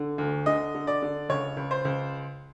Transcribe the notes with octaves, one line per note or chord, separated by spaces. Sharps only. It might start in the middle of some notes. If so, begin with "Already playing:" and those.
Already playing: D3
D2
D3 D#5
D3
D5
D3
C#2 C#5
C#2
C5
C#2